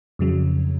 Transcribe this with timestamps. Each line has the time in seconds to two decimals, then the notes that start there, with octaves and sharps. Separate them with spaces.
0.19 F2 C#3 F#3